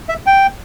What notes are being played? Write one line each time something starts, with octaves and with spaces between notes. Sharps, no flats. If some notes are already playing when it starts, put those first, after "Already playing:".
E5
G5